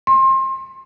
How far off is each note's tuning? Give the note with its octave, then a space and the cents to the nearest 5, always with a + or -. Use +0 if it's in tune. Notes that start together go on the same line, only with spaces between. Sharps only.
C6 +30